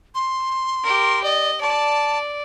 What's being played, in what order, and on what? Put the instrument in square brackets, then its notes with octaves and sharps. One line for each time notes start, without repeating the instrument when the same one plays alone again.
[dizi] C6
[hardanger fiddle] G4 A#4
[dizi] D5 [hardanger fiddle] D#5
[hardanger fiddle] D5 [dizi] A5